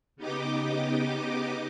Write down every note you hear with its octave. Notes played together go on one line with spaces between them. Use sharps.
C#3 B3 D#4 G4 D#5 D6